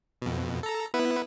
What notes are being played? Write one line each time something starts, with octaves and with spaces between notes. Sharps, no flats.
F2 B2
A4 A#5
B3 E4 B4